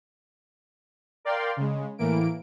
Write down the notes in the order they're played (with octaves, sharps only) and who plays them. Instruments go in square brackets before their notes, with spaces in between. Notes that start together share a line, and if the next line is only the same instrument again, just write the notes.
[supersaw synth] A#4 D5 F5 G5 C6
C#3 G#3
A2 E3 A#3 D7